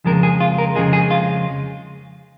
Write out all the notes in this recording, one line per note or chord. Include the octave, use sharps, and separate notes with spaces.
F2 C#3 F3 G#3 A#4
G#4
F4
A#4
F2 C#3 F3 G#3 G#4
G#4
F4